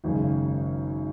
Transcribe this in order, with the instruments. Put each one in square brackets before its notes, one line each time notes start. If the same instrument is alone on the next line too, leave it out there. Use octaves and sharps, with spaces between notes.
[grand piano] G#1 F#2 C#3